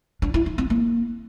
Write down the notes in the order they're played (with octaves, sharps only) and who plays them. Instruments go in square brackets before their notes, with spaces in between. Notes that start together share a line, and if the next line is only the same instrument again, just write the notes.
[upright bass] D4
E4
D#4
C4
A#3